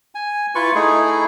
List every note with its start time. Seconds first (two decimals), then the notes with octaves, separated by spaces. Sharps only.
0.15 G#5
0.55 E4 F4 B4 C#6
0.75 A3 D#4 E4 G#4